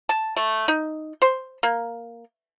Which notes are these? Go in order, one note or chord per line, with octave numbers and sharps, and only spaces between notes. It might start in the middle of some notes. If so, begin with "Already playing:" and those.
A5
A3
D#4
C5
A#3